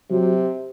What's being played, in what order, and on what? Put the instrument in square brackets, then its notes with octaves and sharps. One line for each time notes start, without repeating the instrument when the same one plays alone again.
[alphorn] C3 [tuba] F#3